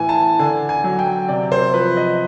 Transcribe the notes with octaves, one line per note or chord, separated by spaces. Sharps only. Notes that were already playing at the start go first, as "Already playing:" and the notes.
Already playing: A2 E3 G#5
A5
D3 G#5
G#5
F#3
G5
C3 D5
C5
F3 B4
D#5